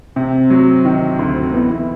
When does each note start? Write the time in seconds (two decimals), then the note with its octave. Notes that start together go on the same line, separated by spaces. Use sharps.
0.16 C3 C4
0.50 F#3
0.85 D#3
1.19 D2
1.54 E3 B3
1.71 E4